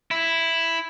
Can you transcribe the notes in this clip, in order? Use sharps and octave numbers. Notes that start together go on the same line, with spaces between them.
E4